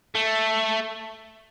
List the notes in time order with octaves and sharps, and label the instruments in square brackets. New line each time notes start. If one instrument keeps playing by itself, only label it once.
[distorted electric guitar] A3